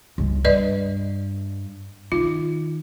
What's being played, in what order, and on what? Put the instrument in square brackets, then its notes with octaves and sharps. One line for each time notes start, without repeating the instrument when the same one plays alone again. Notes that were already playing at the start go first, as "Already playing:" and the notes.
[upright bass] C#2 G2
[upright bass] G2 [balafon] B4 D5 D#5
[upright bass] D#3 [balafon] F4